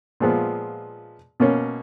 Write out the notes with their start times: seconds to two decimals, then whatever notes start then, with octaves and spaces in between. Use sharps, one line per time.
0.20 A#2 F3 G#3 B3
1.40 B2 A#3 C#4